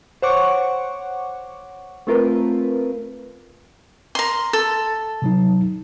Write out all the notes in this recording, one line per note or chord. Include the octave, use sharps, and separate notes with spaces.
C5 C#5 F#5 C#6 D6
A3 C4 F4 A#4 B4
A#4 C6
A4
C3 F#3 D#4